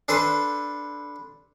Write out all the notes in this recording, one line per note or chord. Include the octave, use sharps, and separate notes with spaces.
D4 A4 B4 C5